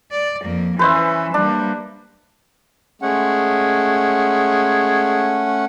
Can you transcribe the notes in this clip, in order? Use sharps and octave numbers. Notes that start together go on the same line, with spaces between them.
D5
F2 A#3
E3 C#4 B4 C5 E5
G3 A#3 D4
G#3 A3 C#4 F#5